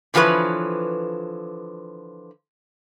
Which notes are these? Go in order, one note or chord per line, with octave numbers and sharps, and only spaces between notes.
D3 E3 F3 F4 B4 C#5